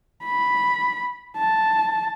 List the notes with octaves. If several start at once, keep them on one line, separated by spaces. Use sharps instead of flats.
B5
A5